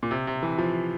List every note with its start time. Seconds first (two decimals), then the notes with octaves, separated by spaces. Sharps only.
0.03 A#2
0.11 C3
0.27 C3
0.43 E3
0.58 F3